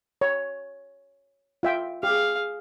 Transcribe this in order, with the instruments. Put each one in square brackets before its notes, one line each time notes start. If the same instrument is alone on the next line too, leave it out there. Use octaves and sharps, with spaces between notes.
[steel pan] C#5
F4 E5 G5
[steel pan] G4 [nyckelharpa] G#4 F5